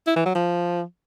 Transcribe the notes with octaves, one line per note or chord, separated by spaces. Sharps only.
E4
E3
F#3
F3